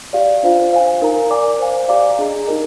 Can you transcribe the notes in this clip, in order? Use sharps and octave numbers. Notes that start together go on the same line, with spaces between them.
G4 D5 F5
D4 F4 C5 F5
C5 F5 G#5
D#4 A#4 F5 A#5
A#4 D5 G#5 D6
C5 F5 G#5
G4 D5 F5 A#5 D6
D4 G#4 D#5 A#5
D#4 G4 A#4 D#5